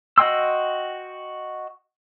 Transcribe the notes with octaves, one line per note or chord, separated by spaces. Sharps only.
F#4 D#5 G5 C6 E6